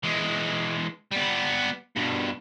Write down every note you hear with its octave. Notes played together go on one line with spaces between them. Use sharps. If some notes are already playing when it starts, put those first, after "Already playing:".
E3 G#3
G3 B3
G2 B2